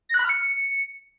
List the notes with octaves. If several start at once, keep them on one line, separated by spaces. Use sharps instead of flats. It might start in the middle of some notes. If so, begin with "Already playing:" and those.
A#6
F#6
B5
F6
C#7